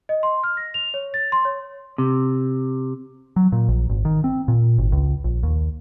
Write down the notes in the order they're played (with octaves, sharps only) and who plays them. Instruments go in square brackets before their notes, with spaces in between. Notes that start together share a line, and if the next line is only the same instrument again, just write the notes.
[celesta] D#5
C6
F6
A#6
F7
C#5
A6
C6
C#5
[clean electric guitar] C3
[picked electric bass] F#3
A#2
A#1
G#1
D#3
C4
A#2
G#1
C#2
A#1
D#2